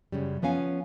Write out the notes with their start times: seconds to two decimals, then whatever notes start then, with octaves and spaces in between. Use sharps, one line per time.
0.12 F#2 C#3 G3
0.42 F3 B3 C#4 F5 G#5